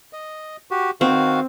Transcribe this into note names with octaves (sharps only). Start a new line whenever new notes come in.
D#5
F#4 G4
D#3 C4 F#4 F5